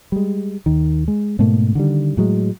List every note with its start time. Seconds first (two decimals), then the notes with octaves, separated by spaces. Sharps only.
0.12 G3 G#3
0.66 D#2 D#3
1.08 G#3
1.39 G#2 B2 A3 A#3
1.75 D3 D#3 G3
2.17 A2 F#3 G#3